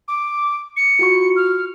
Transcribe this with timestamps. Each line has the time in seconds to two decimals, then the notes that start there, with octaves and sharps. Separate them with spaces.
0.08 D6
0.76 C#7
0.99 F4 F#4 C#6
1.36 F6